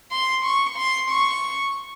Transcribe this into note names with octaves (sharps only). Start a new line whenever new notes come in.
C6
C#6
C6
C#6